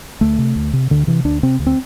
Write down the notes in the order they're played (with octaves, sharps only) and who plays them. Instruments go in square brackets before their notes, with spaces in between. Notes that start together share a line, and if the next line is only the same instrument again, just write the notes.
[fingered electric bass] D2 A3
C3
D2
C3
D2 D3
C3 E3
D2 D4
C3 C4
D2
C4